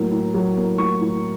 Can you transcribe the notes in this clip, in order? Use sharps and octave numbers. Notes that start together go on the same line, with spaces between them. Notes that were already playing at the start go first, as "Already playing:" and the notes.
Already playing: A2 F#3 A#3
A2
F#3
A#3
A2 C#6
A2